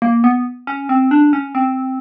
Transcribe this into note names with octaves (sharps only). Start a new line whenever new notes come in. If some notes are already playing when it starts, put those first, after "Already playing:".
A#3
B3
C#4
C4
D4
C#4
C4